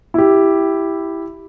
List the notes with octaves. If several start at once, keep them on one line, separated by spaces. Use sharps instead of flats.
E4 G4